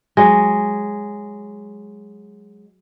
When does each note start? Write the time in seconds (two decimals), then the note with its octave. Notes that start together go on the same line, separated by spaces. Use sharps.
0.17 F#3 G#3